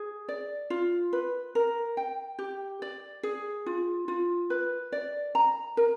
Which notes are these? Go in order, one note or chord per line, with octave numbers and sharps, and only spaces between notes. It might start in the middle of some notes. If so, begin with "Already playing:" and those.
Already playing: G#4
D5
F4
B4
A#4
G5
G4
D5
G#4
F4
F4
B4
D5
A#5
A#4